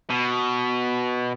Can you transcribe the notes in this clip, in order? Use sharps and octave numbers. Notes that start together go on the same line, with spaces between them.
B2